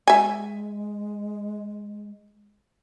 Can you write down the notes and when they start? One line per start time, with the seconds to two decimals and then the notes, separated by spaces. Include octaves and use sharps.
0.07 G#3 E5 G#5